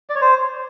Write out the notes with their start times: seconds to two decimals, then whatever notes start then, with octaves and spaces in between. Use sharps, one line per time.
0.10 D5
0.15 C#5
0.21 C5